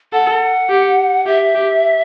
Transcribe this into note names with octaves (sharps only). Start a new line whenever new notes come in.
A4 F#5
G4
G4 E5
G4